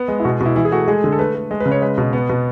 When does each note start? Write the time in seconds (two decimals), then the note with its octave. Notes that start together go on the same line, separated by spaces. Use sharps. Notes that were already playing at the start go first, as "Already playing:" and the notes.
Already playing: B3
0.08 G#3
0.20 E4
0.24 B2 F#4
0.41 B2
0.46 E4
0.56 E3 E4
0.65 G#4
0.72 A3 F#4
0.88 G#3 G#4
1.04 D3
1.12 A4
1.19 A3 B4
1.35 A3
1.51 G#3
1.60 B4
1.66 C#3
1.71 C#5
1.82 G#3 B4
1.98 B2
2.13 B3
2.29 B2